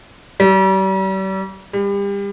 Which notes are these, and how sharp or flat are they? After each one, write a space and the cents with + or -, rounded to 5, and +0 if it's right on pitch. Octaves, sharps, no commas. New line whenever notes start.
G3 -40
G3 +30